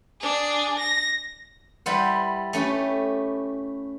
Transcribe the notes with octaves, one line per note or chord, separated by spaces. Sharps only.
D4 G#4
A#6
G3 E4 B4 C5 F#5
A3 C#4 G4 B4